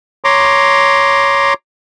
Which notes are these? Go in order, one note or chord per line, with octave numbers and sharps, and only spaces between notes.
C#5 A#5 C6 D6